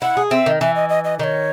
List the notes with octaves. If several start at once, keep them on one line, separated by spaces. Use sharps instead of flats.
E4 F#5
G#4
C4 E5
D#3
E3 E5
D#5
D#5
D#5
D#3 C#5 D#5